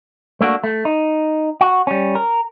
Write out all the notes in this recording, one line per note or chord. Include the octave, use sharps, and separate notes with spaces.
A3 A#3 D4 F#4
A3
D#4
F#4
G3 C#4
A#4